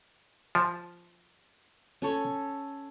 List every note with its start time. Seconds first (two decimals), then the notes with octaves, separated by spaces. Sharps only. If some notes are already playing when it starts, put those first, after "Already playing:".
0.55 F3
2.02 C#4 A4 C#5